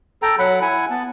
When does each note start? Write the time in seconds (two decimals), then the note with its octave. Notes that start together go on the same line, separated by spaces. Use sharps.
0.22 A4 G5 A#5
0.39 F#3 F#5 B5
0.62 E4 F#5 G#5
0.90 B3 A5